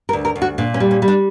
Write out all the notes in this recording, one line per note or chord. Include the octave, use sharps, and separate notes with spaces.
A#4
D2
A#4
D2
F#4
A#2 D4
C#4
G3
C#4
G3
D4